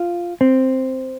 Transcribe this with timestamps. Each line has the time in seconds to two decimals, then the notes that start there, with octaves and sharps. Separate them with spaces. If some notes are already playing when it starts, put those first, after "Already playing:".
Already playing: F4
0.41 C4